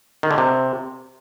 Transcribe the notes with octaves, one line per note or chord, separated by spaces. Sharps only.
D#3
D3
C3